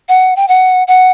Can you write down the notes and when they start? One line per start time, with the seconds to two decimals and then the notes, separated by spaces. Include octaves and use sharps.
0.09 F#5
0.36 G5
0.48 F#5
0.88 F#5